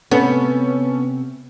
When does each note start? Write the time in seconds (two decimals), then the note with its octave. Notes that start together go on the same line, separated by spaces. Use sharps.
0.12 C3 B3 C#4 A4